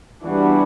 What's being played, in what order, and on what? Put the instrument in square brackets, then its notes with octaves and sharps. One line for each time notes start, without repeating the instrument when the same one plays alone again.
[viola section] E3 G3 B3 D4 F#4